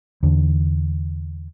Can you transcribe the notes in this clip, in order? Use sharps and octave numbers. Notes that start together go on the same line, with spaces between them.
E2 D3